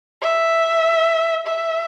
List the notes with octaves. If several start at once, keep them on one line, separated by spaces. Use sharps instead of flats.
E5
E5